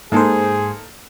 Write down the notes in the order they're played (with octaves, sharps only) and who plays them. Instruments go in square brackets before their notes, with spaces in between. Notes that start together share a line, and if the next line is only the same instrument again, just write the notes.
[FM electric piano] G#2 C5 [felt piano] A#3 D#4 A4 [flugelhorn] G#4